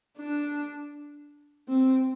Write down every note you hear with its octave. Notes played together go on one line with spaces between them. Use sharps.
D4
C4